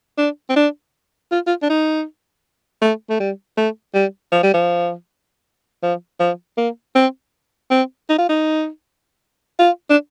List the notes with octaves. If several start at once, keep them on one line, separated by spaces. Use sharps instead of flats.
D4
C4
D4
F4
F4
D4
D#4
A3
A3
G3
A3
G3
F3
G3
F3
F3
F3
A#3
C4
C4
D#4
F4
D#4
F4
D4